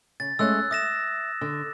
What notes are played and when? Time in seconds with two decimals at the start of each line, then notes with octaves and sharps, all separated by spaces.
0.20 C#3 A6
0.39 G#3 A3 C#4 E6 F#6 A6
0.71 E5 D#6 A#6 E7
1.41 D3